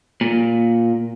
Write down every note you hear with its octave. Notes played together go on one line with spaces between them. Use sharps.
A#2